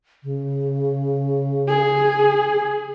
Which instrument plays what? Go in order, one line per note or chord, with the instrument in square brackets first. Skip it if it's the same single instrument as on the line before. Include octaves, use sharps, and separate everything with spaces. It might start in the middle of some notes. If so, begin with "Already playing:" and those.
[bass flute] C#3
[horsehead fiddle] G#4